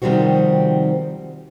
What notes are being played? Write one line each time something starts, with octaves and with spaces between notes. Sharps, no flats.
C3 D#3 F3 G3 C4 F#4